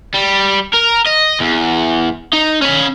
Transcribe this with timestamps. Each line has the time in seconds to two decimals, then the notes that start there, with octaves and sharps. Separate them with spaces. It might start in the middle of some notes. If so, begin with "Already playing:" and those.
0.14 G3
0.74 A#4
1.07 D#5
1.41 E2
2.33 D#4
2.62 C#4 B5